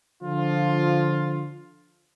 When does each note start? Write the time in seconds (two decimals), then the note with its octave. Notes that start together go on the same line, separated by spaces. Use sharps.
0.23 D3 F3 F4